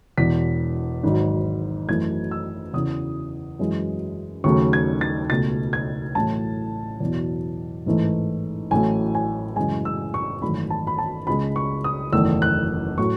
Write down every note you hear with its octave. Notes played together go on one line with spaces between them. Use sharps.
E1 E2 B2 B6
G#1 G#2 F#3
F#2 E3 A3 G#6
E6
E2 C#3 E3 D#6
F#2 E3 G#3
D#2 C#3 F#3 A3 C#6
G#6
A6
C#2 B2 A3 A6
G#6
A1 A2 F#3 A3 A5
E2 B2 F#3
A1 G#2 E3 A3
A1 A2 F#3 A3 G#5
G#5
F#2 C#3 E3 G#3 G#5
E6
C#6
G#1 F#2 E3 A3 B5
A5
B5
A5
C#2 C#3 G#3 B5
C#6
D#6
F#1 E2 D#3 A3 E6
F#6
A2 F#3 A3 C#6